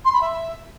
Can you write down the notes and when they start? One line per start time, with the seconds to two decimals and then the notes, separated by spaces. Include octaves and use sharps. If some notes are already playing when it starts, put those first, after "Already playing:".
0.05 C6
0.13 B5
0.21 E5